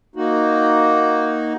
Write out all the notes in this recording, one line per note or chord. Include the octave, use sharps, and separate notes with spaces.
A#3 D#4 F#4